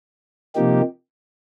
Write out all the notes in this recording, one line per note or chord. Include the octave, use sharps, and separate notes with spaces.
C3 F3 A#3 D#4 G4